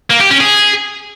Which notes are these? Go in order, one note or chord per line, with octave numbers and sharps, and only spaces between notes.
A#3
G4
C#4
G#4